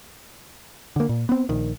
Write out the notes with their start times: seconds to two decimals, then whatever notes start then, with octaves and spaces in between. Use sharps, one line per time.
0.96 D3 A#3
1.09 A#2
1.29 B3 C4
1.49 A#1 D#3